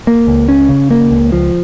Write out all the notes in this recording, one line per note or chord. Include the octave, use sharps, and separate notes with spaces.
A#3
C#2
C#4
C#3
A#3
C#2
F3